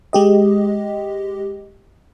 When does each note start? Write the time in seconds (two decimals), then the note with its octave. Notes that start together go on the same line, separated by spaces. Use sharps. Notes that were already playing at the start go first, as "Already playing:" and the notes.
0.13 G#3 G4 D#5